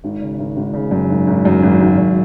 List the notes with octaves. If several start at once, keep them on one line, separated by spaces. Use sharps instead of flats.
G#1
C#3
G#1
G#1
C#3
F#2
G#1
G#1
F#2
G#1
G#1
F#2